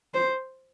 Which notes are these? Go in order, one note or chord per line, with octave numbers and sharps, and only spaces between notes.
C5